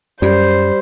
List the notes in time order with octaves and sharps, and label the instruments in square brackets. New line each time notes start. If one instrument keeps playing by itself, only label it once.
[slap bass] F#2 [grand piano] G3 [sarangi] C5